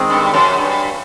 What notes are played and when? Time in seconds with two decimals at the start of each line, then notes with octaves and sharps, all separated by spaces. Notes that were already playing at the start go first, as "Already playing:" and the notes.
Already playing: D#3 G#3 C4
0.10 G2
0.34 F#2
0.58 G2